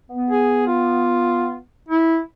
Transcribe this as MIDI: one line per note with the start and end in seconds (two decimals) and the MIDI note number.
0.10 1.60 59
0.31 0.62 68
0.67 1.55 65
1.89 2.19 64